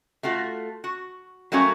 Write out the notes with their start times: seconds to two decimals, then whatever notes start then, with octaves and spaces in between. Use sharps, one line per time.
0.23 A3 F4 F#4
0.84 F#4
1.52 F#3 G3 A3 A#3 C#4 F#4